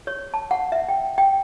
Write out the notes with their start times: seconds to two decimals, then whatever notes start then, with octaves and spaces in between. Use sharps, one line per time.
0.07 C#5
0.34 A5
0.51 F#5
0.72 E5
0.89 G5
1.18 G5